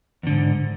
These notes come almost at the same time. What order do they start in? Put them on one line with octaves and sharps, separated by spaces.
E2 D3 G#2